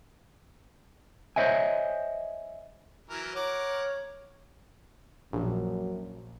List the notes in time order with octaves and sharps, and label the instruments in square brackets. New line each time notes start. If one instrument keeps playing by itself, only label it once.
[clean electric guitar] C5 C#5 D#5 E5 G#5
[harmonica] E3 F#3 A#4
[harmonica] A#4 F#5 D6 [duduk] C#5
[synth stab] A#1 [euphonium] F#2